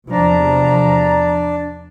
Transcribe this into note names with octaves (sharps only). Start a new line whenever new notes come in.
E2 C3 F3 D4 A#5